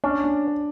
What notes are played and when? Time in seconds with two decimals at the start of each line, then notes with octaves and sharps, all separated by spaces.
0.04 C#4 D4
0.24 D4